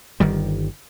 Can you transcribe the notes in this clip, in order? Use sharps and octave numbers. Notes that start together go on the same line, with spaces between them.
G1 D#3 G3